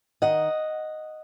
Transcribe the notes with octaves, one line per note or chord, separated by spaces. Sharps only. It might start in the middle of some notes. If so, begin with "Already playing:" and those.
D#3 D#5 F#5